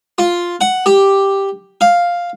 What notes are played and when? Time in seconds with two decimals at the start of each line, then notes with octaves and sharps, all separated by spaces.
0.18 F4
0.61 F#5
0.86 G4
1.81 F5